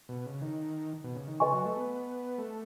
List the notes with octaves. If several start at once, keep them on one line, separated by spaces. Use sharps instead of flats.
B2
C#3
D#3
B2
C#3
D#3
C#3 B4 D#5 G#5 C#6
F#3
A3
B3
A3